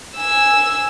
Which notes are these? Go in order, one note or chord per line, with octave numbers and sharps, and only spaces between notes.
G#5 E6